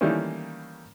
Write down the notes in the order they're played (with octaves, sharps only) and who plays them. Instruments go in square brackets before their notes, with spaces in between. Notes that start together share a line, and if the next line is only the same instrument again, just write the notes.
[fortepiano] D#3 E3 G3 A3 A#3 C#4